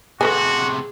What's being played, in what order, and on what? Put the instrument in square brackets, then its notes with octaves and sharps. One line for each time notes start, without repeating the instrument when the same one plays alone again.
[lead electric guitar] A2 C3 [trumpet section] F#4 [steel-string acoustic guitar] G#4 [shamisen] A4 B4 G#5